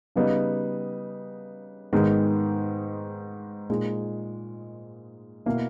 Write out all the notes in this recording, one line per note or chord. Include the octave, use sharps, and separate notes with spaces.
C#3 G3 B3 D#4
G#2 D#3 G#3 B3
A#2 G#3 D#4
B2 A#3 E4